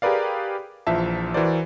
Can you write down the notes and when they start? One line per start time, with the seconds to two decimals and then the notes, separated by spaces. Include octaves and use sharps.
0.02 G4 G#4 A#4 B4 D5 F5
0.87 A#1 E3 F3 E5 A5
1.34 E3 F#4 A#4 C5 D5